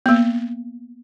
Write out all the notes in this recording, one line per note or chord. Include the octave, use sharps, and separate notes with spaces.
A#3 B3